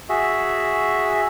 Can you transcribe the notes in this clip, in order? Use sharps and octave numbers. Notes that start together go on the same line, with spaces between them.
F#4 G#4 E5